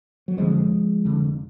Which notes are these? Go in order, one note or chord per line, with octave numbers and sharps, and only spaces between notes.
F#3
F1 F2 D3 F3 G#3
F1 F2 D3